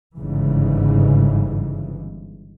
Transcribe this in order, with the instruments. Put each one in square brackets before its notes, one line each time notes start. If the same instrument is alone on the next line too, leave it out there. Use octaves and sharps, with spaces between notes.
[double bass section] G1 G#2 C#3 E3